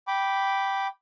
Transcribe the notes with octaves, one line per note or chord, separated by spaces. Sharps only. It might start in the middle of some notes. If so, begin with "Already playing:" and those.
G5 B5 D6